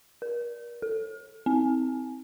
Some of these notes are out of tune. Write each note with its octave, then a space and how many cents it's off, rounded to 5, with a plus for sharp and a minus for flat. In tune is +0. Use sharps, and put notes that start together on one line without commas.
A#4 +40
A4 +10
C4 -15